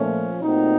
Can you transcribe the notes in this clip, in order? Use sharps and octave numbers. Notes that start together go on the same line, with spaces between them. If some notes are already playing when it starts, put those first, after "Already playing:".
Already playing: A#2 F3 A3 C#4
A#2 F#3 A3 C4 D#4